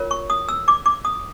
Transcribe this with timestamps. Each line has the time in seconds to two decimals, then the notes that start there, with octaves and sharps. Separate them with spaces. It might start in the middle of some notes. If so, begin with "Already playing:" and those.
Already playing: F4 A#4 C#5
0.11 C#6
0.30 D#6
0.49 E6
0.68 D6
0.86 D6
1.05 D#6